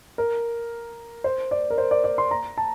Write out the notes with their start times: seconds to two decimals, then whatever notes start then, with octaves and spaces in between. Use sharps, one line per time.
0.18 A#4
1.24 C5
1.51 D5
1.70 A#4
1.78 C5
1.91 D5
2.04 D5
2.18 C6
2.31 A#5
2.58 A5